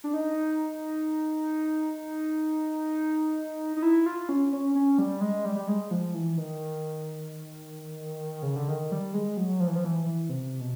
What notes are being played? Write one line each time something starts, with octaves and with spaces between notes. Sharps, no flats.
D4
D#4
D#4
E4
F4
C#4
C#4
C#4
G3
G#3
G3
G3
G#3
F3
E3
D#3
C#3
D3
D#3
G3
G#3
F#3
F3
E3
F3
E3
E3
C3
B2